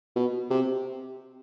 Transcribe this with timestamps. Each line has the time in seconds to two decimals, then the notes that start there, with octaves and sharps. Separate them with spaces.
0.16 B2
0.50 C3